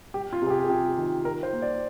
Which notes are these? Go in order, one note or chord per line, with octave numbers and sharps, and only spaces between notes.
G3 G4
F4
C3 G#4
G4
G#4
C3 G4
D#3
D#3 A#4
C5
A#3
D5